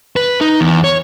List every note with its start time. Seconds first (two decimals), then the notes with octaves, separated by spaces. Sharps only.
0.16 B4
0.41 D#4
0.61 E2
0.84 C#5